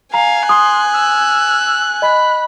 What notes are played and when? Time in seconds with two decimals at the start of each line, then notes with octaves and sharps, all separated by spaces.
0.14 F5 G#5 A#5
0.49 C6 D#6 F#6
0.93 E6
2.02 D#5 B5